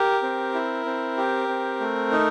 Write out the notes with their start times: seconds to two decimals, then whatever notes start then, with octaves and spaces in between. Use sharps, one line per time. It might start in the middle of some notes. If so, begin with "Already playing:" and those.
Already playing: G4 A#4
0.23 C4
0.54 E4
0.86 C4
1.17 G4
1.48 C4
1.80 A3
2.12 D#4